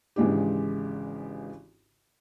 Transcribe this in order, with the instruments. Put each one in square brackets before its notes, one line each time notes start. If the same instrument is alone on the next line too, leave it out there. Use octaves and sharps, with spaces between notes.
[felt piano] G#1 C#3 E3 G#3 D4 G4